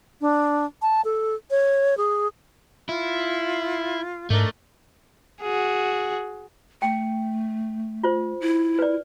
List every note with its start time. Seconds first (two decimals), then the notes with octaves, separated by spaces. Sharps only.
0.21 D4
0.82 A5
1.05 A4
1.51 C#5
1.97 G#4
2.89 E4 F4
4.30 G#2 A3 D4 A#4 D#5
5.41 F#4 G#4
6.82 A3 G5
8.04 F4 C5
8.41 E4
8.79 B4 D5